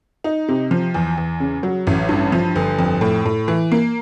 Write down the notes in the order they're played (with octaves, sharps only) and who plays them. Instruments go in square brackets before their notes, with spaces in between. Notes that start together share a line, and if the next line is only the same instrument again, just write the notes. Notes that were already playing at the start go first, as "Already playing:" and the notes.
[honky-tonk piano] D#4
C3
F3
E2
E2
C#3
F#3
A1
G2
F3
G1
F2
A2
A2
E3
A#3